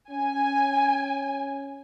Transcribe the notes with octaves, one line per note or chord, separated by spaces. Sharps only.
C#4 G#5